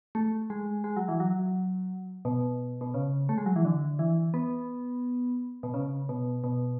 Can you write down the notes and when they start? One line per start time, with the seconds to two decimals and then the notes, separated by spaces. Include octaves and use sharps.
0.15 A3
0.50 G#3
0.84 G#3
0.97 F#3
1.09 E3
1.20 F#3
2.25 B2
2.81 B2
2.94 C#3
3.29 A3
3.38 G#3
3.46 F#3
3.56 E3
3.65 D3
3.99 E3
4.34 B3
5.63 B2
5.74 C#3
6.09 B2
6.44 B2